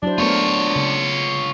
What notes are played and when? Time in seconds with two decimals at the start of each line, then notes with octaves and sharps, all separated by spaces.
0.03 F#3 D4 E4 C5
0.18 A3 B3 F4 A#4 C#5
0.76 C#3